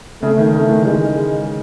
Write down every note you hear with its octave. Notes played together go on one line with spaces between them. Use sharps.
C#3 A3
D#3
C#3 A3
E3
D#3
D#3 G#3
G#3